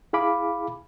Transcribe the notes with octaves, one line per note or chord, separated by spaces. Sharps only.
E4 G#4 F5 B5 D6